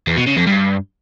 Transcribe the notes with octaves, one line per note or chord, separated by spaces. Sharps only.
E2
B2
C#3
F2
G2